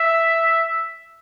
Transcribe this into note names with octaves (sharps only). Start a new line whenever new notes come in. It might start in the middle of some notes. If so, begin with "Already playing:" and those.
Already playing: E5